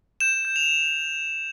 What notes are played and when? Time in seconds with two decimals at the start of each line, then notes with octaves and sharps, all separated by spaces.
0.20 G6 E7
0.45 G6
0.56 F7